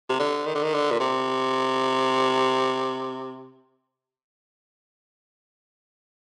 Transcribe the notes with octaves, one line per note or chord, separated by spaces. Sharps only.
C3
D3
D#3
D3
D#3
D3
A#2
C3